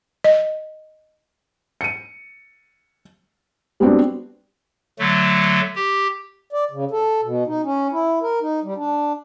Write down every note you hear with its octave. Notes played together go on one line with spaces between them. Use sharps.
D#5
C#7 D#7
G3 B3 C4 D4 F#4
D3 F#3 A3
G4
D5
C#3
A4
B2
D#4
C#4
E4
A#4
D#4
G3
D4